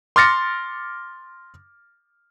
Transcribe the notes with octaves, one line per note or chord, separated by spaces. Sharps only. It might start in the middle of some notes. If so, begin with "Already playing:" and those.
C6 D6 F6 A6 A#6 C#7